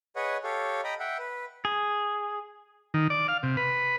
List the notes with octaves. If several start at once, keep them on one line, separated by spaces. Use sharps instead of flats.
G#4 B4 C#5 D#5 F#5
G4 A4 C#5 F5
D#5 G5 A#5 B5
E5 F#5 G5
B4
G#4
D#3
D5
F5
C3
B4